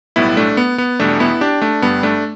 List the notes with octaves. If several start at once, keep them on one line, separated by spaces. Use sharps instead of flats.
B1 A2 G3 B3 E4
A3 D4
B3
B3
E2 B2 G3 A3 D4
B3 E4
D4 G4
A3 D4
G1 G2 G3 B3
A3 D4